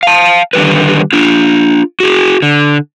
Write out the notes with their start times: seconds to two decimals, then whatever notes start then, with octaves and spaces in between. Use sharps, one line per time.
0.03 F5 A5
0.53 D3 D#3 G3 B4
1.13 D4 F4
2.00 F#4 G#4
2.42 D3